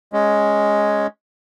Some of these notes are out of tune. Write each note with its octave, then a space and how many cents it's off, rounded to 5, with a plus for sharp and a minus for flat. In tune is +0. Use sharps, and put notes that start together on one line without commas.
G#3 +5 C#4 +0